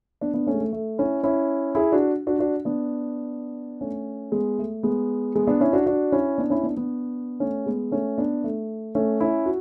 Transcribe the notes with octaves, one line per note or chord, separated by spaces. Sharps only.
B3 D4
B3 D4
A3 C#4
G#3
A3
A3
C#4 E4
C#4 E4
E4 G#4
D4 F#4
D4 F#4
D4 F#4
B3 D4
A3 C#4
G#3 B3
A3
G#3 B3
G#3 B3
B3 D4
C#4 E4
D4 F#4
D4 F#4
C#4 E4
B3 D4
C#4 E4
B3 D4
B3 D4
A3 C#4
G#3 B3
A3 C#4
B3 D4
A3
A3 C#4
C#4 E4
F#4